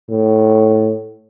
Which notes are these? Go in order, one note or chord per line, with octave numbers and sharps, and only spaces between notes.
A2